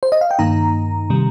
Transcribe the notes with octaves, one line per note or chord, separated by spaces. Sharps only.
C5
D#5
F5
G5
G2 D#3 A#3 D#4 A#5
C3 D#3 G3